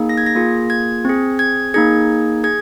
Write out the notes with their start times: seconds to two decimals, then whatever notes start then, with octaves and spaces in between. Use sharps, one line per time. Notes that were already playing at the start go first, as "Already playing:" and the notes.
Already playing: A#3 D#4 G#4
0.09 A#6
0.18 G#6
0.26 A#6
0.35 A#3 F4 G#4
0.70 G#6
1.05 C4 G#4
1.39 G#6
1.74 A#3 D#4 G#4 G#6
2.44 G#4 G#6